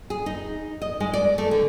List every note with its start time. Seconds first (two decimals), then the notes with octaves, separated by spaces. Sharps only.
0.10 G#4
0.26 D#4
0.82 D#5
1.00 G#3
1.13 D5
1.38 A3
1.51 D3